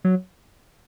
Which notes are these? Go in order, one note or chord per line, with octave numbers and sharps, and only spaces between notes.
F#3